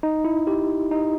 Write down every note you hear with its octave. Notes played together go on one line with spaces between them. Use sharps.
D#4
E4
G4
D#4